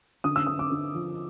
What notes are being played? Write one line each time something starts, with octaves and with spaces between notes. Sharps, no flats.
D3 D#6
E6
D3 D#6
D6
D3
F3